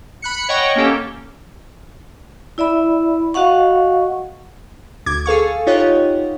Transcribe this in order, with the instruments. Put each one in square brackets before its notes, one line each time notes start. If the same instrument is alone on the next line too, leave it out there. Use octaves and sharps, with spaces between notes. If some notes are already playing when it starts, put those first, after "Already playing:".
[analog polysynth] B5 F#6 C#7
C#5 D#5 F#5 G5 C#6
A#3 C#4 G4 A4
[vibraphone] E4 D5 E5 B5
F#4 D#5 F5 F#5 C#6
[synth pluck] D2 D6 G#6
G#4 A4 F5 C#6
D#4 F4 G4 C#5 D#5 F#5